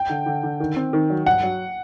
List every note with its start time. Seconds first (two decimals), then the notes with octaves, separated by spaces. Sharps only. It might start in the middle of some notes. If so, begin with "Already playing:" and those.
Already playing: G5
0.10 D3
0.26 D3
0.43 D3
0.60 D#3
0.76 C4
0.93 D#3
1.10 F#3
1.26 G2 F#5
1.43 F#3